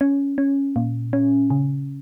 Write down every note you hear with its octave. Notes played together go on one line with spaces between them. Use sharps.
C#4
C#4
A#2
C#4
C#3